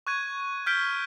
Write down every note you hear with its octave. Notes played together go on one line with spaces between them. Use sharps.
C#6 F#6 G#6 D#7
F6 G6 B6 D7 G7